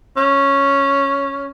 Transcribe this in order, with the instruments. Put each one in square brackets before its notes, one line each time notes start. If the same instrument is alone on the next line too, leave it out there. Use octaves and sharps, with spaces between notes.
[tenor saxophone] C#4